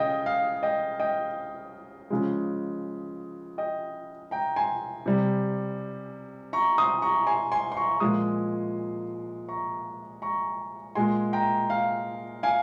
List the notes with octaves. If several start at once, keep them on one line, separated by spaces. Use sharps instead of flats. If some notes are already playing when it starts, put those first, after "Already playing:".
Already playing: C#3 D#5 F5 G5
F5
D#5 G5
D#5 G5
C#3 F3 G#3
D#5 G5
G5 A#5
G#5 C6
C3 G3
A#5 C#6
C6 D#6
A#5 C#6
G#5 C6
G#5 C6
C6
A#5 C#6
A#2 F3 G#3 C6 D#6
A#5 C#6
A#5 C#6
A#2 G#3 G#5 C6
G5 A#5
F5
F5 G#5